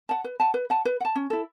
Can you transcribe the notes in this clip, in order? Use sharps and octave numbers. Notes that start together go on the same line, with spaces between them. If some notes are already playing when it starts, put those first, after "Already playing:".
F#5 A5
B4
F#5 A5
B4
F#5 A5
B4
F#5
A5
C#4
E4 A4